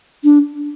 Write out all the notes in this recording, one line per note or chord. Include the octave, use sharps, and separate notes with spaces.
D4